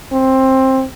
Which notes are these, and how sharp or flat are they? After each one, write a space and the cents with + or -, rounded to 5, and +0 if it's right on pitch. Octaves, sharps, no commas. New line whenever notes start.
C4 +15